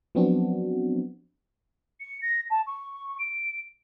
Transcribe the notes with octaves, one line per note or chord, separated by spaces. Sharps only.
F3 F#3 B3 C4 D4 F#4
C#7
A#6
A5
C#6
D7